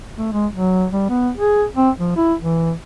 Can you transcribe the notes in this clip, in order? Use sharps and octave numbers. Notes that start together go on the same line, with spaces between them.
A3
G#3
F#3
G3
B3
G#4
C4
F3
E4
E3